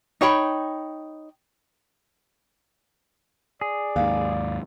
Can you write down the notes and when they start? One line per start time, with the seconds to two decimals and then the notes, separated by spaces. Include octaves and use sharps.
0.21 D#4 C#5 G5 B5
3.61 G#4 D5
3.96 D#2 G#2 F5